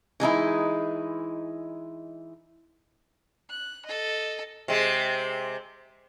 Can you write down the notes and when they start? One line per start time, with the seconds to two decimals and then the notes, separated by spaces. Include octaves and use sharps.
0.20 E3 G#3 D#4 E4
3.50 F#6
3.86 A4 D#5
4.68 C3 G#3